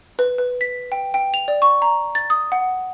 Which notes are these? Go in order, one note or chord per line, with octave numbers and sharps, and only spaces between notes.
B4
B4
B6
G5
G5
F7
D5
C#6
A#5
A6
D#6
F#5